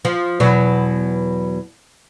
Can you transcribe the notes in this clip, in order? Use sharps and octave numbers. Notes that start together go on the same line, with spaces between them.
F3
E2 B2 F#3